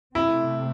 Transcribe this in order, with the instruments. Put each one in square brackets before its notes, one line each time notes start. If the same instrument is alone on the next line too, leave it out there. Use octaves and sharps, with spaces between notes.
[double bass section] C3 A3 C4 [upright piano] E4